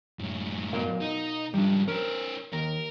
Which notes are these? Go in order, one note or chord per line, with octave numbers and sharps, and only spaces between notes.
F#2 A2
B2 A#4 F5
D#4
G#2 F3 G3 D4
C#4 A#4 C5
D#2 A#4